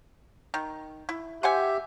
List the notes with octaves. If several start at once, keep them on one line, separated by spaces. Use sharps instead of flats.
D#3
E4
G4 C5 E5 F#5 G#5